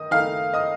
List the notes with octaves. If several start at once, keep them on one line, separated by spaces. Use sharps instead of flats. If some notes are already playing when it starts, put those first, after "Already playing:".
Already playing: D#3 D#5 D#6
D#3 A3 D#4 F5 F6
D#5 D#6